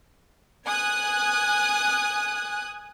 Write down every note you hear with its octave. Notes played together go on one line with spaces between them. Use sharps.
G#5 D#6 F#6